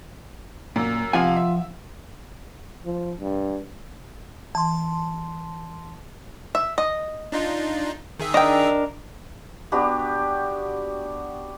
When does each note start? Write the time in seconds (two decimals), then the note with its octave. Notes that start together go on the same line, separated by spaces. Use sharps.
0.76 F#2 A#2
1.13 C3 F3 F4 F5 F#5 G#5
1.36 E5
2.85 F3
3.20 G2
4.55 E3 A5 C6
6.55 E5
6.78 D#5
7.32 D4 D#4 F4
8.19 D#3 G#4 E5
8.34 D4 A#4 D#5 G5
9.72 B3 D4 F#4 G4